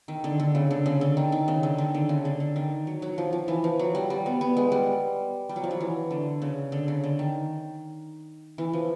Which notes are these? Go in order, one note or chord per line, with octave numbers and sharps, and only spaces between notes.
D#3
D3
D3
C#3
D3
C#3
D3
D#3
D#3
C#3
D3
D#3
D3
C#3
D3
D3
D#3
F#3
F#3
F3
F3
E3
F3
F#3
G3
G3
B3
B3
G#3
G3
G3
F#3
F3
F#3
E3
D3
C#3
D3
C#3
D3
D#3
E3
F3